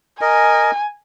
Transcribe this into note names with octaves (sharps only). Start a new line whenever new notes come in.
A#4 D#5 G#5